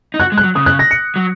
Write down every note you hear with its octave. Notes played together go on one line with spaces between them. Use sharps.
D#4
F#4 F#6
G#3
F#6
F#3
C#3 D#6
F#6
A#6
C#7
F#3